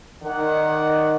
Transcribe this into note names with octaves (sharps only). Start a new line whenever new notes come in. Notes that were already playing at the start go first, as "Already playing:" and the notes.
D#3 D5 F#5